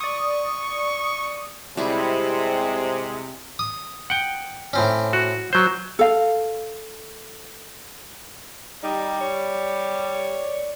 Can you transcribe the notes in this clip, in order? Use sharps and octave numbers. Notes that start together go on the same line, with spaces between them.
D5 C#6 D#6
C3 G3 G#3 E4 G#4
D#6
F#5 G5
A2 C4 C#4
F#4
F#3 C5
A4 F5
G3 D#4
C#5
D5